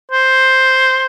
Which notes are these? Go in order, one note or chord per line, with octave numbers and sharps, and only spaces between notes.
C5